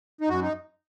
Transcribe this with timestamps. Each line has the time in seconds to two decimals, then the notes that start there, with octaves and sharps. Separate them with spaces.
0.21 D#4
0.28 F#2 F#4
0.42 D#4